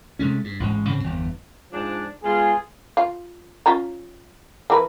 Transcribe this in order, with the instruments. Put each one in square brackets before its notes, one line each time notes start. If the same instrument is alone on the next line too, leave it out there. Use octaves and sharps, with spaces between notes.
[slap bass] C3 G#3 A3 C#4
G2
A1 G#2 G#3
G#2 C#3 C4
G1 E2
[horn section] G#2 F3 D4
[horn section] G#3 B3 F4 [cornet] G#4
[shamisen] F4
C#4 F4 A#5
E3 A#4 B4